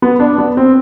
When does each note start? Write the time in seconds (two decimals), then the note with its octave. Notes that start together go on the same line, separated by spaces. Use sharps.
0.02 B3
0.20 D4
0.38 B3
0.57 C4